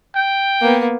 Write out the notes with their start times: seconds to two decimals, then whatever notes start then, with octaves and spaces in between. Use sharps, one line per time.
0.15 G5
0.61 A#3 B3